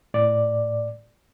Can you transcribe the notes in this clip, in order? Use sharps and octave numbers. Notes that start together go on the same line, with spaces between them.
A2 D5